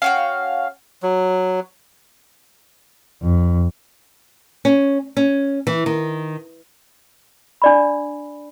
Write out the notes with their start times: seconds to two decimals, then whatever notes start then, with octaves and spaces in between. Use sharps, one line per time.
0.02 C#4 F#4 F5 G5
1.03 F#3
3.22 F2
4.65 C#4
5.17 C#4
5.67 E3
5.86 D#3
7.62 D4 D5 B5